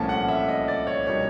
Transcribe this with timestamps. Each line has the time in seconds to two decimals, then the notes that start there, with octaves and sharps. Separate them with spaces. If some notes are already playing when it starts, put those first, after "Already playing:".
Already playing: C2 A#2 F3 A3 C#4 A5
0.09 F#5
0.28 E5
0.48 D#5
0.68 D5
0.87 C#5
1.07 B2 G3 A#3 D#4 C#5